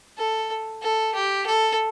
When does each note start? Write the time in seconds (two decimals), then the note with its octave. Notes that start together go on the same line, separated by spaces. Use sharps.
0.18 A4
0.82 A4
1.15 G4
1.46 A4